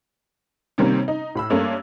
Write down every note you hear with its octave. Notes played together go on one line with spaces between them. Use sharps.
C3 D#3 G3 A#3 C4 C#4
D#4
A2 B5 E6
G2 A3 A#3 C#4 D4